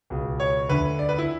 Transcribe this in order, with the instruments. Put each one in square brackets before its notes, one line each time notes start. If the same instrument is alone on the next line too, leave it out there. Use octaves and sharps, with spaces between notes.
[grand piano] C#2 B2
C#5
D2 D3 B4
D5
B4
E4